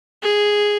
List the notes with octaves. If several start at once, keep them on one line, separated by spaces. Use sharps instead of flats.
G#4